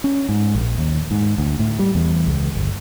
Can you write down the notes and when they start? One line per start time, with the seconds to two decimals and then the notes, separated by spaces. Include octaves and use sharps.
0.04 C#4
0.29 G#2
0.55 A#1
0.78 D#2
1.11 G#2
1.38 D2
1.59 A2
1.79 G3
1.95 E2
2.27 C#2
2.55 G1